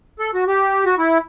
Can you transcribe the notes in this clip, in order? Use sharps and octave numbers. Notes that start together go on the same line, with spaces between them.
A4
F#4
G4
F#4
E4